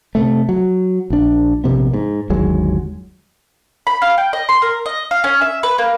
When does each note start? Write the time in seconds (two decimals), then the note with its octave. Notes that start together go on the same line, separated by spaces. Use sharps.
0.15 C3 A3
0.49 F#3
1.10 A#1 D4
1.64 A#1 C3 B3
1.94 G#2
2.30 G1 D#2 F#3 G#3
3.87 B5
4.02 F5
4.18 G5
4.33 D#5
4.49 C6
4.62 A#4
4.86 D#5
5.11 F5
5.24 C#4
5.41 E5
5.63 B4
5.78 A#3